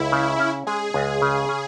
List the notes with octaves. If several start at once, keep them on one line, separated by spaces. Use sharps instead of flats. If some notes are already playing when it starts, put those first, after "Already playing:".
Already playing: C#2 E4
C#3
C#4
G#3 G#4
C#2
C#3
C#4